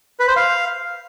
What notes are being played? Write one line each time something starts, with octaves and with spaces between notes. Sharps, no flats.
B4
C5
F5